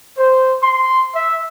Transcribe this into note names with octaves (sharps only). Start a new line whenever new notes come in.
C5
C6
E5